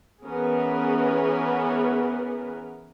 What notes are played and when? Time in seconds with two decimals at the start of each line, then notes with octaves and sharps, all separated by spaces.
0.24 E3 B3 C#4 G#4 A#4 B4